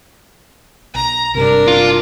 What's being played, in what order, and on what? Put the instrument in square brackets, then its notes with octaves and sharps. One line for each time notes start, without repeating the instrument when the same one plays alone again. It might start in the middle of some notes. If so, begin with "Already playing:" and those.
[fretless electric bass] B1 [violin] A#5
[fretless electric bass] G#1 G2 C3 [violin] D4 A#4
[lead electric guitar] F4